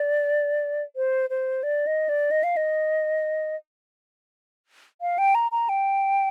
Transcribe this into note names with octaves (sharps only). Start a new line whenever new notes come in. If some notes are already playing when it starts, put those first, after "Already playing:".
Already playing: D5
C5
C5
D5
D#5
D5
D#5
F5
D#5
F5
G5
A#5
A#5
G5